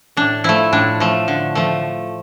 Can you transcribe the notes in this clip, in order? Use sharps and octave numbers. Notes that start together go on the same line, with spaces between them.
A2 D4
F3 A3 E4
A2 D4
F3 A3
D3
F3 A3